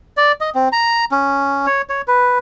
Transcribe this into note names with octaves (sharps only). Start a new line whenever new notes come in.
D5
D#5
C4
A#5
C#4
C#5
C#5
B4